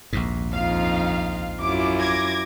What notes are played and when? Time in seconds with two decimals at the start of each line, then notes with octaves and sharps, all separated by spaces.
0.13 A#1 D#2 G#2
0.53 F2 D#4 F4 F5
1.61 F#2 E4 F4 D6
1.99 D6 G#6 A#6